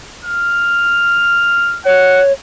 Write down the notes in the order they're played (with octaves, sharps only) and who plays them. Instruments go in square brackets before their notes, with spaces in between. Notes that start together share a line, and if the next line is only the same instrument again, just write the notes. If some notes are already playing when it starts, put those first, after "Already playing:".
[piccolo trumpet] F6
[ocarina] C#5 [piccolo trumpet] F#5